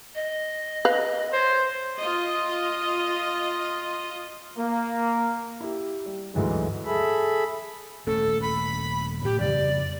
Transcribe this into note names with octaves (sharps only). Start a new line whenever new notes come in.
D#5
B4 F5
C5 C#5
F4 D#5
A#3
E4 G4
G3
D2 G#2 E3 F#3 G#3
G#4 A4 E5 B5
D#1 A3 C#4 A4
B5
A1 A2 G4
F2 C#3 G3 D5